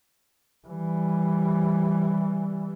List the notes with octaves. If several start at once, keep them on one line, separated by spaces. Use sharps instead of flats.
E3 G3